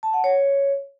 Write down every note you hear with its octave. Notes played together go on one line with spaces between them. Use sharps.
A5
F#5
C#5